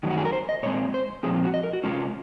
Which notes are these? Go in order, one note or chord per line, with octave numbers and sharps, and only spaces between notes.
F#2 D#3 F#3
F#4
G#4
A#4
C5
D#5
A#2 G#3 C4 C#5
C5
A#2 F3 C4 G#4
F4
F#4
D#5
A#4
F#4
C3 D#3 G#3 C#4 F4